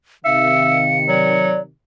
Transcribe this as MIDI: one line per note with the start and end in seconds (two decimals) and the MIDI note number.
0.25 1.70 48
0.25 1.70 51
0.25 0.80 76
0.25 0.97 77
0.25 1.47 97
1.08 1.58 54
1.08 1.60 74